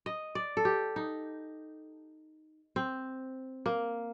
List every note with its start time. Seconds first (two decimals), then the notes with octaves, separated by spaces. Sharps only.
0.06 D#5
0.35 D5
0.57 A4
0.65 G4
0.96 D#4
2.76 C4
3.66 A#3